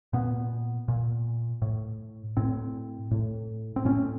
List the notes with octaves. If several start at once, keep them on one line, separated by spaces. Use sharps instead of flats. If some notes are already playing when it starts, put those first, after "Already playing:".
A#2 B3
A#2
A2
A2 C4
A2
C4
A2 C#4